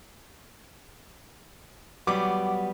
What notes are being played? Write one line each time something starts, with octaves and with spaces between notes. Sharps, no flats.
F#3 G3 B3 F#5 D6